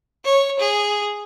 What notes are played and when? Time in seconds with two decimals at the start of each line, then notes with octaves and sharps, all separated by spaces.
0.24 C#5
0.59 G#4